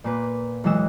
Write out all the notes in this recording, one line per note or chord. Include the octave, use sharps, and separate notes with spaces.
A#2 A#3 B4
B1 E3 F#3 G#3 F#4 E6